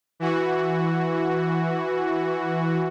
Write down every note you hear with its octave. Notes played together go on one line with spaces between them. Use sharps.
E3 F#4